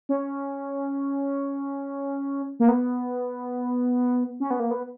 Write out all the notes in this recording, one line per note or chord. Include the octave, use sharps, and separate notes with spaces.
C#4
A#3
B3
C#4
B3
A#3
B3